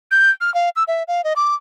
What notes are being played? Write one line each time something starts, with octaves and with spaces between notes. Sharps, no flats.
G6
F6
F5
E6
E5
F5
D#5
D6